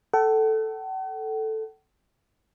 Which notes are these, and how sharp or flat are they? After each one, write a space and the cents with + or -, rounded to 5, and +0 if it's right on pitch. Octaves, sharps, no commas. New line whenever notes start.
A4 +0 F#5 +45